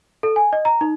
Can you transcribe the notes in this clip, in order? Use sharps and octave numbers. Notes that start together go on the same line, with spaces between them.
A4
G#5
D#5
A#5
D#4